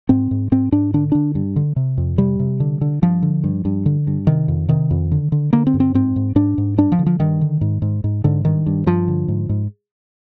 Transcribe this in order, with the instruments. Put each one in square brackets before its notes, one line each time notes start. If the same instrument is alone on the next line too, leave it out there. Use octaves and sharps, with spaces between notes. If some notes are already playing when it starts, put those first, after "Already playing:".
[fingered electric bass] G#2 C4
G#2
G#2 C4
G#2 D4
D3 D4
D3 D4
G2
D3
C3
F2
C3 G3
C3
D3
D3
G2 F3
D3
G2
G2
D3
G2
C3 D#3
F2
C3 D#3
F2
D3
D3
D3 A#3
C4
G2
C4
G#2 C4
G#2
G#2 D4
G#2
G2 D4
F3
D3
F3
G2 D#3
D3
G#2
G#2
G#2
G#2 D3
G2 D#3
G2
G2 F3
D3
G#2
G#2